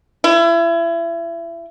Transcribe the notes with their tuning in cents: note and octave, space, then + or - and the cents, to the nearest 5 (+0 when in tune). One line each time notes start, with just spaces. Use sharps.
E4 +30